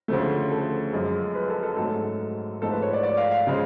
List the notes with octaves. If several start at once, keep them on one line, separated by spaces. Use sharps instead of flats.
D2 C#3 F3 A3
A4
F#2 F3 G#3
B4
A4
A4
G#2 F#3 A3 A4
G#2 F3 A3 A4
B4
C#5
D5
D5
F5
F5
C#3 F3 G#3